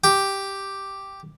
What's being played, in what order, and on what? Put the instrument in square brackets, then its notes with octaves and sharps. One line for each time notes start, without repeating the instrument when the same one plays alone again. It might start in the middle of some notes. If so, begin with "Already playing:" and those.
[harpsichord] G4